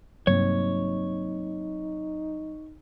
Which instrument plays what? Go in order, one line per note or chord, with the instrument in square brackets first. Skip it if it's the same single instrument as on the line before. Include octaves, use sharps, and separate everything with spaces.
[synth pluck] G2 C3 [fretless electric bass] F#3 A#3 C4 [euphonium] D#4 [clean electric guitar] C#5